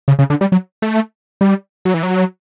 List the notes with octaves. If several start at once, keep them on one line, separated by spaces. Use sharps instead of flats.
C#3
C#3
D3
G3
F#3
A3
G3
F#3
E3
F#3